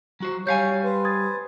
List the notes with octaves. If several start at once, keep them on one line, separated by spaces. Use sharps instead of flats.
F#3 F#4 C5
G3 C#5 F5 G#5 G6
B4 C5
D#6 G#6 A6